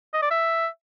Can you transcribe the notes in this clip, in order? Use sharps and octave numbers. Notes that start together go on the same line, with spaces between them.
D#5
D5
E5